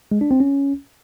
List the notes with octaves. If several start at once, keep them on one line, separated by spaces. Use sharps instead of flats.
G#3
D4
C4
C#4